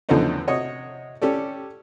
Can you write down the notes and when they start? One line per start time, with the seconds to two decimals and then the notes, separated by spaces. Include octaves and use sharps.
0.09 E2 D3 F3 A3 C#4 D#4
0.47 C3 F#4 C#5 D#5 D#6
1.22 C#4 G4 A4 D5